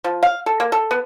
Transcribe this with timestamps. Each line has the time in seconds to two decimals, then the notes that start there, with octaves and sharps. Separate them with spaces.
0.04 F3
0.23 F5
0.46 A4
0.60 A#3
0.72 A4
0.91 B3